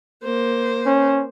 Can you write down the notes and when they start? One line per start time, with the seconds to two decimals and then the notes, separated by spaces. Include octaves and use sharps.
0.24 A#3 C5
0.86 C#4